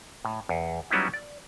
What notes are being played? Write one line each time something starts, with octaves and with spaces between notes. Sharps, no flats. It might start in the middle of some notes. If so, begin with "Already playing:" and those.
A2
E2
F#3 G3 B3 C#4 D#4 E4
D5